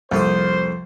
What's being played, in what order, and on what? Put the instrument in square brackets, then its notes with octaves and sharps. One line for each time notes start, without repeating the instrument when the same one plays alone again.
[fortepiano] C2 [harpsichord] F2 A#3 D#6 [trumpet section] C5